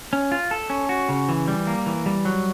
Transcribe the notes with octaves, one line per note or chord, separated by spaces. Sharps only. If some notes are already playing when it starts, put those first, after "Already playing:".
C#4
F4
A4
C#4
F#4
C#3
E3
G3
A#3
E3
G3
F#3